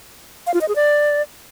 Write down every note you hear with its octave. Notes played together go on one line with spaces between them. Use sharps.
F5
F4
D#5
G#4
D5